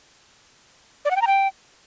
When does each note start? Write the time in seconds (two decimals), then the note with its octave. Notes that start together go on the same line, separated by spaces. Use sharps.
1.05 D5
1.11 F#5
1.16 G5
1.22 A#5
1.27 G5